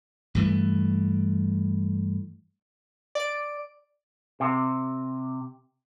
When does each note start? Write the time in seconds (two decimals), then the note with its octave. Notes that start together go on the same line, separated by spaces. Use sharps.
0.35 G2 E3 A3
3.15 D5 D7
4.40 C3